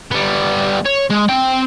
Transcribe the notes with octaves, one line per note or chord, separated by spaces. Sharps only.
G3 B3
C#5
G#3
C4 G5